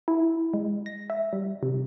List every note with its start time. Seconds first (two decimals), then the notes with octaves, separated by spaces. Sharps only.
0.08 E4
0.53 G#3
0.86 A#6
1.10 E5
1.33 G3
1.63 C3